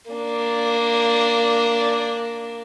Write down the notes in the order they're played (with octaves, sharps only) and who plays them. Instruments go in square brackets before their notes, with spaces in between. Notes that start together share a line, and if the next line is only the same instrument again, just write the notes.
[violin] A#3 D4